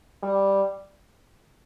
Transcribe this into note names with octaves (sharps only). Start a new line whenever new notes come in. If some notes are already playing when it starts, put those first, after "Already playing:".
G3